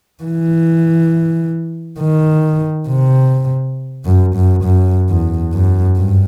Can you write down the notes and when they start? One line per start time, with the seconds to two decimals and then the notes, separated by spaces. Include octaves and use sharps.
0.24 E3
2.00 D#3
2.87 C3
4.05 F#2
4.35 F#2
4.64 F#2
5.09 E2
5.53 F#2
5.96 G2